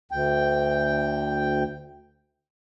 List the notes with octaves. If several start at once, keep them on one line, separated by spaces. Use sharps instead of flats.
D2 G5